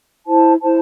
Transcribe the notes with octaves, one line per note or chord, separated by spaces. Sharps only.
E4 C5 A5
E4 C5 A5